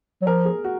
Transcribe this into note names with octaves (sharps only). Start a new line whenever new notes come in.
F#3
F3 A#4
G#4
F#4